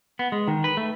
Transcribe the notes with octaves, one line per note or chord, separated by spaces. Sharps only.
B3
G#3
D#3
B4
A3